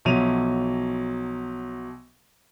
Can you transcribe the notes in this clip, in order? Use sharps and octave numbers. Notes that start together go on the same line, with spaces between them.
B1 F3 F#3 E5 D#7 F7